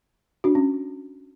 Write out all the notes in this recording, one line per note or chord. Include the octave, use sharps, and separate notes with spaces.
D4 F#4
C#4